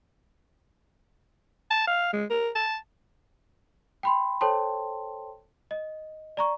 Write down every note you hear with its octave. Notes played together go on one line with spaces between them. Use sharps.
A5
F5
G#3
A#4
A5
G5 B5 C6
A4 C5 C#5 G5 A5 C6
D#5
D5 A#5 C#6